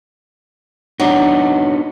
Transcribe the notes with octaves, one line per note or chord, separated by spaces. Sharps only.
F#3 B3 D4 D#4